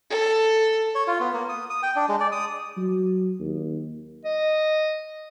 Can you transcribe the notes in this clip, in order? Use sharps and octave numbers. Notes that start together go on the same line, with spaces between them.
A4
C#5
F4
B3
A#3
D#6
D#6
G5
D4
G#3
D5
D#6
F#3
D#2
D#5